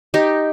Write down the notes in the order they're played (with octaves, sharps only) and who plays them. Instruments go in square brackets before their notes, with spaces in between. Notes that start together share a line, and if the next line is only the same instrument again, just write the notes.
[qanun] D#4 G4